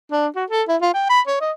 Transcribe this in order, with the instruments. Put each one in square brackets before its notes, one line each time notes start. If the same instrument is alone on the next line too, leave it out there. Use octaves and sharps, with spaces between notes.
[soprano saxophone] D4
F#4
A4
E4
F4
G5
B5
C#5
D#5